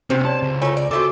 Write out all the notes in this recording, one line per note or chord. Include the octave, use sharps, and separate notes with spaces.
C3 C4 C#4 G4 C5
G4 C#5 D5 A5
C#2
A3 D#4 F4 C#5 G#5
D5
D#3 A3 C4 F#4 A4 D6